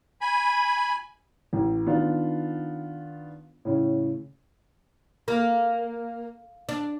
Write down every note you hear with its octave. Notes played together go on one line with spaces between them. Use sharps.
G#5 B5
A1
D#3 B3 D4 F4
A2 C#3
A#3
D4